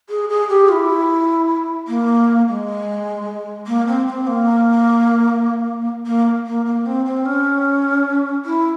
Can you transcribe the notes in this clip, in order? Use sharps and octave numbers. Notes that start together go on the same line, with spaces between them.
G#4
G#4
G4
F4
E4
A#3
G#3
A#3
C4
C4
A#3
A#3
A#3
A#3
C4
C4
C#4
E4